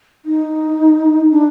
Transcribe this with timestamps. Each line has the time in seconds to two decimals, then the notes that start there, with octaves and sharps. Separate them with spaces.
0.25 D#4
1.31 D4